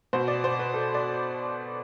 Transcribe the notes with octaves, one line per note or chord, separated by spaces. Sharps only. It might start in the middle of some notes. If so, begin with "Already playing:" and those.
B2 C5
D5
C5
B4
A4
D5